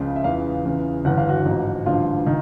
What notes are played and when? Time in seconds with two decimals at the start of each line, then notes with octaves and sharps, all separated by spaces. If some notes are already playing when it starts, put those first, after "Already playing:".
Already playing: C#2 C#3 F3 F4
0.16 E5
0.24 E2 C#3 E3 F4 F5
0.65 E2 C#3 E3
1.05 G1 G2 E3 F#5
1.18 F5
1.29 F#4 F#5
1.45 A1 G#2 F3
1.86 A1 G2 D3 F3 F4 F5
2.26 D#3